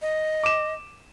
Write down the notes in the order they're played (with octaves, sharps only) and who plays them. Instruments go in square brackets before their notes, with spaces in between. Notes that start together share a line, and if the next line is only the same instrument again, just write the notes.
[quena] D#5
[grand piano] D6 E7